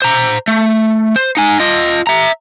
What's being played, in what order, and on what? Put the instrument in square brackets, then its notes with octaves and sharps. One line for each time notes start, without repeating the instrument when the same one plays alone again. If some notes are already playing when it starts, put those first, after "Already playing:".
[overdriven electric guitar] C5 A#5
A3
C5
D#4 G#5
F4 D#5
E5 A#5